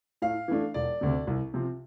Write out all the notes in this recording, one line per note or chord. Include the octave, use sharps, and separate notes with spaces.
A2 F5
E3 A3 D4
E1 D5
D2 C3
C2
C3 F3 C4